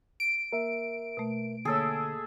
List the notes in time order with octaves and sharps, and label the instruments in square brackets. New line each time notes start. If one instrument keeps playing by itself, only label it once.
[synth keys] D7
[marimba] A#3 [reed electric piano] A#4 E5
[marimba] B2 A3
[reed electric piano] D3 [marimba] A#3 C#5 [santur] G#4 A4 E5